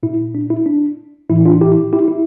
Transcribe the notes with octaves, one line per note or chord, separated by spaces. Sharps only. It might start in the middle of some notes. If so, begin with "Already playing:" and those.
A#2 E4
D4
E4
D4
A2 E3 E4
D4 F4
E4 G4
E4 G4
E4